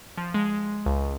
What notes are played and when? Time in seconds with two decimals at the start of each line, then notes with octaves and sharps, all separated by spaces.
0.17 F3
0.34 G#3
0.86 C#2